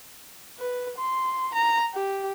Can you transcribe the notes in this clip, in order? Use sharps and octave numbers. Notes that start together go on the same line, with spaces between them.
B4
C6
A#5
G4